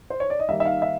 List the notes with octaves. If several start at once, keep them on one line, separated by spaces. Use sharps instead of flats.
C5
C#5
D5
D#5
D#3 G3 A#3 E5
E5
F5
E5